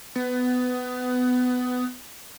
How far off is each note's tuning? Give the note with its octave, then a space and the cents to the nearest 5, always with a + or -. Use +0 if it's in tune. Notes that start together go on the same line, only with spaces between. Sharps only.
B3 +20